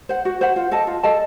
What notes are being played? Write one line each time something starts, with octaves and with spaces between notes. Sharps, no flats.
C5 F#5
F#4
C5 F#5
F4
A4 D#5 A5
F4
A4 D#5 A5